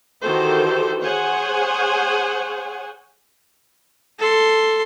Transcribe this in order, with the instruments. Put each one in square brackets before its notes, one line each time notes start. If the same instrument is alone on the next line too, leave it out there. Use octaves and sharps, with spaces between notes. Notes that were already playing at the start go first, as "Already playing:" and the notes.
[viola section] D#3 E3 F#4 G4 A4 C5
G#4 C5 C#5 F#5 G#5
[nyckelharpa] A4 C6